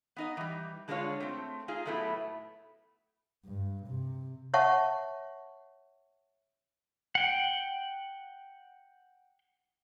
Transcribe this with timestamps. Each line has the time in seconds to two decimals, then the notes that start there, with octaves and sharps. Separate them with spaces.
0.16 B3 D#4 D#5
0.37 E3 G3
0.88 D3 G#3 C4 D4 F4 C#5
1.20 A3 C4
1.68 D#4 F4 G#4
1.86 A2 F#3 A3 B3 E4
3.45 G2
3.87 C3
4.54 C#5 E5 F#5 A5 C#6
7.15 F#5 G5